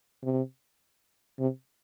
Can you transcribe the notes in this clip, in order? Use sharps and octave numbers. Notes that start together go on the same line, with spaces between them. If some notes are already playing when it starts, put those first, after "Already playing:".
C3
C3